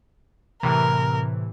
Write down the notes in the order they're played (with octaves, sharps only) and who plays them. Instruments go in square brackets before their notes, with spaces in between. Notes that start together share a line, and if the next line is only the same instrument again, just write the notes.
[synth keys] A2 C3 E3 [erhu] A#4